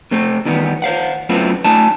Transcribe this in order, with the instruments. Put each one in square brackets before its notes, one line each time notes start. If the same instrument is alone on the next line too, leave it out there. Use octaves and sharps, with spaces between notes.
[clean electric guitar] C3 A3 C4
E2 D#3 G3 B3
C5 F5 F#5
F#2 A3 B3 C4 E4 F4
A3 D#4 D5 G#5 A5